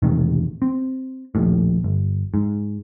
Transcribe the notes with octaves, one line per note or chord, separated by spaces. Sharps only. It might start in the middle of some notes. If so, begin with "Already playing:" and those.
E1 A1 C3 D#3
C4
A#1 D#2 A2
G1
G#2